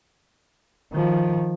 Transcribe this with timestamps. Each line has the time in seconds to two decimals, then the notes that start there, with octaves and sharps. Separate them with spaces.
0.92 D#3 F3